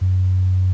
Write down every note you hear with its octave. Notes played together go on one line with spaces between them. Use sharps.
F#2